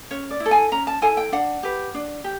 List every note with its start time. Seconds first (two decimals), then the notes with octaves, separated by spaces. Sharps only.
0.11 C#4 C#5
0.31 D5
0.40 E4
0.46 A4
0.51 G#5
0.72 C#4 A#5
0.87 A5
1.02 E4 A4 G#5
1.17 G5
1.32 D4 F#5
1.63 G4 B4
1.95 D4
2.24 G4